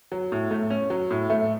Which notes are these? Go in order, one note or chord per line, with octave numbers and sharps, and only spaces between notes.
F#3
A2
A3
C#4
F#3
A2
A3